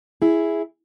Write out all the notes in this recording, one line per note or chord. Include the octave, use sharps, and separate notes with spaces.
E4 G#4